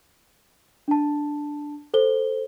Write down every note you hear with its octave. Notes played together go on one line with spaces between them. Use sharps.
D4 A5
A4 C5 G7